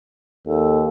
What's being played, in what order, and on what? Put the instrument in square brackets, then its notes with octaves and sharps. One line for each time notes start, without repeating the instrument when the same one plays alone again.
[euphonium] D#2 [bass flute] A4